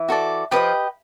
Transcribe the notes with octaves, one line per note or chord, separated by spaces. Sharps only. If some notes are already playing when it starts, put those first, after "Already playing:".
Already playing: E3
F#4 A4 D5
F3 G4 B4 D#5 G5